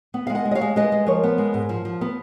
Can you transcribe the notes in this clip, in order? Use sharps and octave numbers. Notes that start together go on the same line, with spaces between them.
B3
F5
G#3
D#5 F#5
G#3
D#5
C#5 F5
G#3
G#3 B4 D#5
G#3
F3 A#4 C#5
B3
G#3
G#2
F3
F3
B3